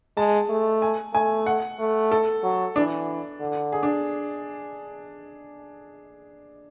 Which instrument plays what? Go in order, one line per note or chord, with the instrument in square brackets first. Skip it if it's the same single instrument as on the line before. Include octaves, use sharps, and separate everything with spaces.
[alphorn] G#3 [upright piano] A5
[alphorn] A3
[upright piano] G#5
[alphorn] A3 [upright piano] G#5
[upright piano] F#5
[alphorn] A3
[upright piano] A4
[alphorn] F#3
[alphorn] E3 [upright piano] D4
[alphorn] D3
[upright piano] G#4
D4